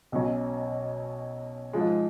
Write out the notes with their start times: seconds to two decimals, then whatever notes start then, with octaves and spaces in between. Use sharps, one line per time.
0.12 B1 B2 F#3 C#4
1.73 G#2 F3 G#3